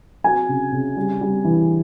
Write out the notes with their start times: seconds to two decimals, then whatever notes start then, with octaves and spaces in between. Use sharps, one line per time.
0.24 F#3 G#5
0.49 C#3
0.72 C#3
0.97 G3
1.21 G3
1.45 E3